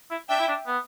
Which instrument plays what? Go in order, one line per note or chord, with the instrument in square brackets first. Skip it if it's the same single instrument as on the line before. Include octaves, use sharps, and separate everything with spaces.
[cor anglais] E4
[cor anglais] D4 [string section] E5 G5
[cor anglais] E4
D4
B3